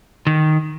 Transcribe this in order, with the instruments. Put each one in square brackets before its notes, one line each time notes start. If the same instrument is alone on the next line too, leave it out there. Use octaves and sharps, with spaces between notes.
[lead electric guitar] D#3